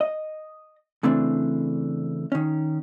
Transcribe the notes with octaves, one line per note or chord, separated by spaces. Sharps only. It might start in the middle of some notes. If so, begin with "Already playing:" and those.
D#5
C#3 E3 A3 C4 D4
D#3 C#4